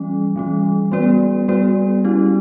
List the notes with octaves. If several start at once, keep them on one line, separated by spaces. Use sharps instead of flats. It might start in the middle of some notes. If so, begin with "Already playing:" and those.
Already playing: E3 G3 C#4
E3 G3 C#4
G3 B3 F#4 B4 D5
G3 B3 F#4 B4 D5
G3 C#4 E4 G4